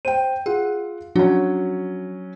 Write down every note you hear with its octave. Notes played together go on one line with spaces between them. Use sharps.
C5 G5 D#7
F4 G#4 F#5
F3 F#3 C#4 D4 F#4